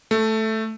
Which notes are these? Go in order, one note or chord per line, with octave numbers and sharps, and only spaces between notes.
A3